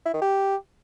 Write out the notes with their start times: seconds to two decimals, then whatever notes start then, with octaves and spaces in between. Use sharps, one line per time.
0.06 E4
0.14 D#3
0.22 G4